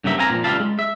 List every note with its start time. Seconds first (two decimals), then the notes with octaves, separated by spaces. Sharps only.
0.04 G2 C#3 F#3 A#3 E5
0.18 C4 F5 G#5 A#5
0.30 A#2 F3
0.44 C#2 G3 F4 E5 F5 A5
0.60 G#3
0.79 E5